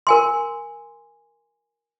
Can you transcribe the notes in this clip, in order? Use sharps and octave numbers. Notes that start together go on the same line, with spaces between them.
A#4 G#5 C6